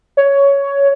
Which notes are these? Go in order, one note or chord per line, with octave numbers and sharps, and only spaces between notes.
C#5